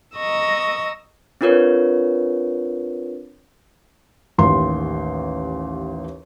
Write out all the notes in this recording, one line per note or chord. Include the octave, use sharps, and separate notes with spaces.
D#5 A#5 C#6 D#6 E6
C4 D4 F4 A#4 B4 C#5
A1 D#2 C6